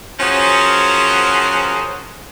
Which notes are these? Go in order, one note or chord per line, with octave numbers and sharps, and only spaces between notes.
F3 C#4 F#4 G#4 A#4 C5